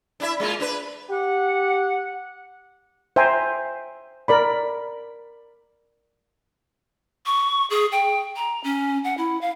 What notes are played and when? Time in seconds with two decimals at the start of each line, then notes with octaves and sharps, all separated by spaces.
0.20 D4 E4 E5
0.40 G#3 A#3 F4
0.60 D4 B4
1.10 G4 F#5
3.16 C5 E5 G5 G#5 A#5
4.28 A#4 D5 B5
7.26 C#6
7.70 G#4
7.92 G5
8.36 A#5
8.64 C#4
9.04 F#5
9.18 E4
9.41 F5